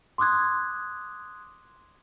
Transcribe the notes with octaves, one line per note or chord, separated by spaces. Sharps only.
C6 D6 D#6 F#6 G#6